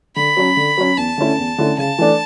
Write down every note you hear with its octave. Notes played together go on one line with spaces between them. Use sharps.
D3 B5
F#3 C#4
D3
F#3 C#4
E2 A5
D3 A3 C#4 E4
E2
D3 A3 C#4 E4
C#3 A5
E3 A3 D4